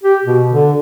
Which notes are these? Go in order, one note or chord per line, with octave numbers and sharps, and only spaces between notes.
G4
B2
D3